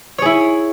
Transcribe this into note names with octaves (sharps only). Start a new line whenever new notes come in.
E4 G#4 C#5